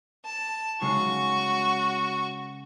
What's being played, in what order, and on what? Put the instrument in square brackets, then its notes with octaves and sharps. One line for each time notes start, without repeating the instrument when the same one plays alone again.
[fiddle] A5
[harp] C#3 G#3 [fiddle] F#4 C#6